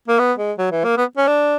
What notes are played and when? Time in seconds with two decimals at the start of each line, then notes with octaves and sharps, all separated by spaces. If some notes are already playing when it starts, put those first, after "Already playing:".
0.08 A#3
0.19 B3
0.38 G#3
0.58 F#3
0.72 E3
0.84 A#3
0.97 B3
1.17 C#4
1.27 D4